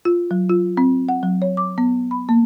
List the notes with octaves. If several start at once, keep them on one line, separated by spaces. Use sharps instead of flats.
F4
F#3
F4
C4
F#5
F#3
C#5
D6
B3
B5
A#3